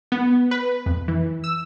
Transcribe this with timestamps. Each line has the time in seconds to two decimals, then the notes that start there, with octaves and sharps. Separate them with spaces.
0.12 B3
0.51 B4
0.86 F2
1.08 E3
1.44 E6